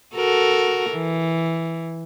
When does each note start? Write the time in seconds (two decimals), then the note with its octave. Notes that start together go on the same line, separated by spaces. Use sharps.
0.15 F#4 A4 A#4
0.92 E3